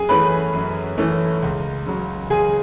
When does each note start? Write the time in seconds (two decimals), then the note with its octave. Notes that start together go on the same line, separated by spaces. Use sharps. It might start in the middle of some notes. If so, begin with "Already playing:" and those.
Already playing: F#2 G#4 G#5
0.09 E3 A3 C#4 B4 B5
0.53 F#2
0.98 E3 A3 C#4
1.43 C#2
1.86 C#3 F#3
2.30 C#2 G#4 G#5